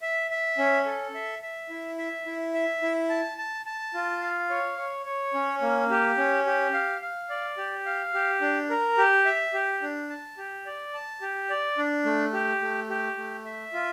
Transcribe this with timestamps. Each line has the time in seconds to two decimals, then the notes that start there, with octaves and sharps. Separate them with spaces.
0.02 E5
0.30 E5
0.58 C#4
0.86 A4
1.14 E5
1.42 E5
1.70 E4
1.98 E5
2.26 E4
2.54 E5
2.82 E4
3.09 A5
3.38 A5
3.66 A5
3.94 F4
4.22 F5
4.50 C#5
4.78 C#5
5.05 C#5
5.34 C#4
5.62 A#3
5.90 G4
6.17 C#4
6.46 G4
6.73 F5
7.02 F5
7.30 D5
7.58 G4
7.86 F5
8.14 G4
8.41 D4
8.70 A#4
8.98 G4
9.26 E5
9.53 G4
9.82 D4
10.09 A5
10.37 G4
10.66 D5
10.94 A5
11.21 G4
11.50 D5
11.78 D4
12.05 A3
12.33 G4
12.61 A3
12.90 G4
13.17 A3
13.45 E5
13.73 F4